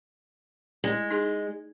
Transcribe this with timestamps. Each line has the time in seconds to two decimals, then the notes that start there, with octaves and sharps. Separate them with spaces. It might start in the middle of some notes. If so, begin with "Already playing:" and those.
0.84 G#3
1.11 D#4 G#4